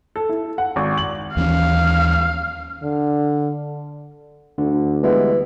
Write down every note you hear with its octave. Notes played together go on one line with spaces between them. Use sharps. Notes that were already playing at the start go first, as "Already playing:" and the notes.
A4
E4
F#5
G#1
F#7
D#2 E3 C#4 F5
D3
D2 D3
E3 G3 G#3 B3